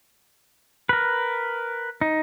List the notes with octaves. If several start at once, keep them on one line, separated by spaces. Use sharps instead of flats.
A#4 B4
D#4